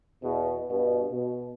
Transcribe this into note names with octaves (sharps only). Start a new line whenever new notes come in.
E2 B2
G2 B2
B2